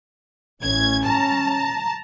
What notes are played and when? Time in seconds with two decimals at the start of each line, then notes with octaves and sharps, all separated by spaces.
0.62 A1 C#4 G#6
1.03 A5 A#5